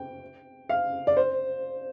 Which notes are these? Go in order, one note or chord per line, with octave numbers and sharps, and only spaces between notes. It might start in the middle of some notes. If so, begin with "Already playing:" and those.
Already playing: G5
F5
D5
C5